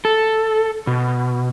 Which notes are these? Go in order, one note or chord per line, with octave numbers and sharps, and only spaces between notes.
A4
B2